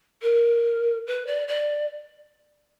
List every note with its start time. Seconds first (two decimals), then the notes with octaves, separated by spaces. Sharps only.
0.22 A#4
1.07 B4
1.26 D5
1.47 D5